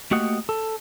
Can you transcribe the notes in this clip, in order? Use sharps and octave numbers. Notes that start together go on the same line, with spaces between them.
A3 A#3 F#4 G4 D#5 F#5
A4